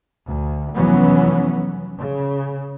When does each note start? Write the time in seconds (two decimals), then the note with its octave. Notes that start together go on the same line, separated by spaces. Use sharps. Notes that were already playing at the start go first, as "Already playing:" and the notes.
0.27 D2
0.74 F1 E3 F#3 B3 C#4
2.00 C#3